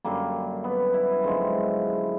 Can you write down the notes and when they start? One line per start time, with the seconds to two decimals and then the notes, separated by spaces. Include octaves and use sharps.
0.05 F#2 D3 G3 A#3
0.64 B3
0.94 E4
1.23 F#2 D3 F3 G#3